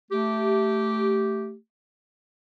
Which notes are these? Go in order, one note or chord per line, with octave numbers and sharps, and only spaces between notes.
A3 G4